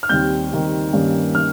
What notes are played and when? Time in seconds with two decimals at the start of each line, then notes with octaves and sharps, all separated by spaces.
0.03 F6
0.09 D#2 D#3 G3 C4 G6
0.51 D#2 D#3 G3 C4
0.93 G2 D#3 A#3 C#4
1.35 D#3 F6